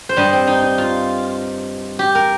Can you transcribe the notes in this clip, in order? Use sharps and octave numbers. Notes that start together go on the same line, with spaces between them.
C5
G2 G3 D#5
C4
D#4
D#4
F4
G4
A#4